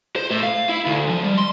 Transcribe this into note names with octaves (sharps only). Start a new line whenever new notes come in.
C5
A2
F5
E4
D2
F3
G3
C6